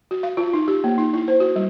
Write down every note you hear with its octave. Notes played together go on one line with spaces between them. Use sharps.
F#4
F5
F4
D#4
G4
A#3
D#4
E4
C5
F#4
G3